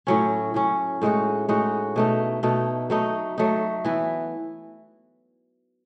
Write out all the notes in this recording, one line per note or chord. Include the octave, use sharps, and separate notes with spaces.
A2 F#3 C#4
A2 F#3 C#4
A2 G#3 D#4 F#4
A2 G#3 D#4 F#4
B2 A3 D#4
B2 A3 D#4
F#3 A3 D#4
F#3 A3 D#4
E3 B3 E4